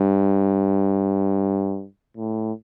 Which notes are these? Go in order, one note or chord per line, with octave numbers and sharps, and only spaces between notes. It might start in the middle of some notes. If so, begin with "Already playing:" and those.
Already playing: G2
A2